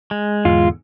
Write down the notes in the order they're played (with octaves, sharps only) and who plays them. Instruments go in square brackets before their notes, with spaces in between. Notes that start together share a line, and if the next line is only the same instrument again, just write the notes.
[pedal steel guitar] G#3
[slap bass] E2 G#2 D3 [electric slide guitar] F4